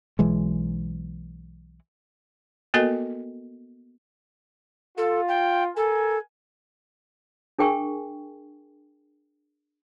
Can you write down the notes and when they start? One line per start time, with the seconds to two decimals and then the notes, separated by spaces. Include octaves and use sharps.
0.19 B1 E3 G#3
2.74 A#3 B3 F#4 A4 A#4 D#5
4.98 F4 A4
5.28 G5
5.77 A4 A#4 G#5
7.59 D4 G#4 A#4 G5 G#5 C#6